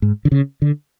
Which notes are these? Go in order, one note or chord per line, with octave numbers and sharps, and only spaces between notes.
G#2
D3
C#3
D3